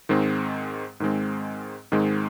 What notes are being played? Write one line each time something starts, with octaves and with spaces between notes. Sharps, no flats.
G#2 D#3 G#3 C4
G#2 D#3 G#3 C4
G#2 D#3 G#3 C4